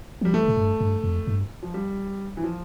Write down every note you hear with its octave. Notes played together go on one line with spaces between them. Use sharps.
F3 G3
E3 A3
A2
G2
G2
F2
G2
F3
G3
E3
F3